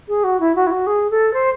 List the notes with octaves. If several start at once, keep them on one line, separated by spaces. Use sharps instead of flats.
G#4
F#4
E4
F#4
E4
F#4
G#4
A4
C5